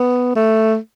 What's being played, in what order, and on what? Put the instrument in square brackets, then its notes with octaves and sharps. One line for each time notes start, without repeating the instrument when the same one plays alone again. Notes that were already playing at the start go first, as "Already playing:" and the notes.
Already playing: [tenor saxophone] B3
A3